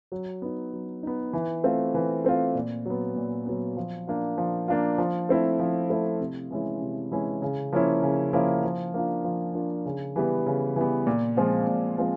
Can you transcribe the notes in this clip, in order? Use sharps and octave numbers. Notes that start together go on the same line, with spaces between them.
F#3
B3 D#4
F#3
B3 D#4
E3
A3 C4 F4
E3
A3 C4 F4
A#2
F#3 B3
A#2
F#3 B3
F3
A#3 D4 F4
F3
A#3 D4 F4
F3
A3 C4 E4
F3
A3 C4 E4
C3
E3 G#3 C#4 E4
C3
E3 G#3 C#4 E4
C#3
F3 A#3 C#4 E4
C#3
F3 A#3 C#4 E4
F3
A#3 D4 F4
F3
A#3 D4 F4
C#3
E3 G3 B3
C#3
E3 G3 B3
A#2
F3 G#3 C4 F4
A#2
F3 G#3 C4 F4